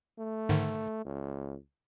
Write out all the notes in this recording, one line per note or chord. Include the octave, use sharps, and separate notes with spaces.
A3
G#2 D3 D#3
C#2